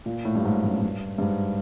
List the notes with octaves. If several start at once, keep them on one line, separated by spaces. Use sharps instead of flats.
A#2
A2
G2
G#2
F#2
G2
G2
G#2